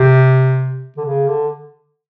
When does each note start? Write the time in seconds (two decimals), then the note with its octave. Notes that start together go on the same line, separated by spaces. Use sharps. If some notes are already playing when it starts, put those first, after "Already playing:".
Already playing: C3
0.97 D3
1.06 C#3
1.28 D3